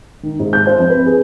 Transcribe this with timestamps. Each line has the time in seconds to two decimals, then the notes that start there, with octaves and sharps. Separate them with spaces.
0.23 D#3
0.39 G#2
0.53 G6
0.67 C5
0.79 F2
0.90 B4
1.06 G#4